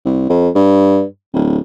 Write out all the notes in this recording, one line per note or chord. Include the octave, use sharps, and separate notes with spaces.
C2
F2
G2
D1